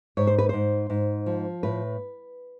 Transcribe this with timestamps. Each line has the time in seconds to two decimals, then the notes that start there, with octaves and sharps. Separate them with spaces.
0.17 G#2 C#5
0.27 C5
0.38 B4
0.49 G#2 C5
0.90 G#2
1.26 F3
1.63 A2 B4